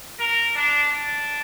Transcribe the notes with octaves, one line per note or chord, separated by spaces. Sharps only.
A#4
D4
D4